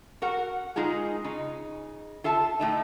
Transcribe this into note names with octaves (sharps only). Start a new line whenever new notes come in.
F#4 A#4 F#5
G#3 D#4 F4 G#4
C#3 D#4
F4 A4 E5 A5
A2 A3 D#4